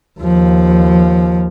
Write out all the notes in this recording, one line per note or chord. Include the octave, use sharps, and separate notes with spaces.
D#2 F3